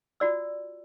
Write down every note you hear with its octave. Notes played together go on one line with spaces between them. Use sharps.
F4 F#4 D5 E6